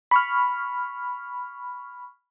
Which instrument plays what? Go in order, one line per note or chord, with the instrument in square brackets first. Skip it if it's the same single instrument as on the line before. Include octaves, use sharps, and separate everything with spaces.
[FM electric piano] B5 C#6 F6